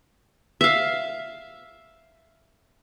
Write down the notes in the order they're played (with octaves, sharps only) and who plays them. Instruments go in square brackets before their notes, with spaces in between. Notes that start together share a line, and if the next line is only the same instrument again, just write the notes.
[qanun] E5 F5